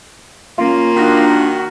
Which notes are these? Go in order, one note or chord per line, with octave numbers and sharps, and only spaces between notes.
A#3 C#4 F4
D#3 D4 F#4